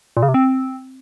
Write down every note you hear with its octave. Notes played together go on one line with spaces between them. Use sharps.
A#2
C#3
C3
C4